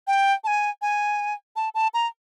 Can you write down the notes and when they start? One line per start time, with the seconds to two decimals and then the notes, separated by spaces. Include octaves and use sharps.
0.07 G5
0.44 A5
0.47 G#5
0.82 G#5
1.56 A5
1.75 A5
1.94 A#5